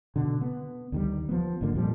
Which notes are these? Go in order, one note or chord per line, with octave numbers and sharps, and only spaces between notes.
B2 D3
B3
D2 D#3 G3
F3 B3
G#1 G#2 D3 A#3
F2 A#2 F3 G3